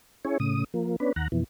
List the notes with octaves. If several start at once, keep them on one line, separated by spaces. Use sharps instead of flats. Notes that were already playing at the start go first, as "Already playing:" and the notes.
C#4 E4 G#4 C#5
A2 C#3 D#6
F3 A#3
B3 C#4 D4 B4
D#2 F#5 A#5
F2 B2 E3